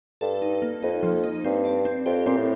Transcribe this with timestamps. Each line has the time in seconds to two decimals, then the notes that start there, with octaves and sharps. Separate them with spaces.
0.21 G2 A4
0.42 D#4
0.62 A#3
0.83 F2 D#4
1.03 F3
1.24 D#4
1.44 G2 C4
1.65 D5
1.85 C4
2.06 F2 G4
2.26 A#2 C4
2.37 A2